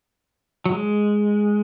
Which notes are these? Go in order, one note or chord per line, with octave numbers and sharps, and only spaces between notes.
F#3
G#3